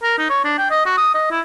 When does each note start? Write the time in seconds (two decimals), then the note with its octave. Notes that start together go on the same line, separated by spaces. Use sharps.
0.03 A#4
0.19 D#4
0.30 C#5
0.44 D4
0.58 G5
0.71 D#5
0.85 F#4
0.98 D#6
1.14 D#5
1.31 E4